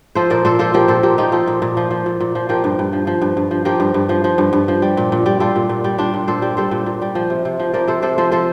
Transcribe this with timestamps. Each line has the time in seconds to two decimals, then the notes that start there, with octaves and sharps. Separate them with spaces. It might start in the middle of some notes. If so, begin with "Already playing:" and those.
0.15 F3 A4 C5
0.30 A#2 A#4 D5
0.45 A#2 A4 C5
0.59 F3 F4 A4
0.74 F3 G4 A#4
0.88 A#2 A4 C5
1.03 A#2 G4 A#4
1.18 F3 D#4 G4
1.32 F3 F4 A4
1.48 A#2
1.62 A#2
1.77 F3
1.91 F3
2.06 A#2
2.20 A#2
2.35 F3
2.49 F3 G4 A#4
2.64 G2
2.79 G2
2.93 F3
3.07 F3
3.22 G2
3.37 G2
3.51 F3
3.65 F3 G4 A#4
3.80 G2
3.94 G2
4.09 F3
4.24 F3
4.38 G2
4.53 G2
4.68 F3
4.82 G3
4.97 A#2
5.12 A#2
5.26 G3
5.40 G3 F4 A4
5.56 A#2
5.69 A#2
5.84 G3
5.98 G3 D4 F4
6.14 A#2
6.28 A#2 A4 C5
6.42 G3
6.57 G3 A4 C5
6.71 A#2
6.86 A#2
7.02 G3
7.15 F3
7.30 C3
7.45 C3
7.59 F3
7.73 F3 A#4 D5
7.88 C3 A4 C5
8.02 C3 A4 C5
8.18 F3 A4 C5
8.32 F3 A4 C5